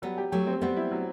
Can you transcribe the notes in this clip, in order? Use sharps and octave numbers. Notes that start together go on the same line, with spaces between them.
F#3 G3 B3
G4
F#3 A3 G4
C4
G3 B3 C4
E4
F#3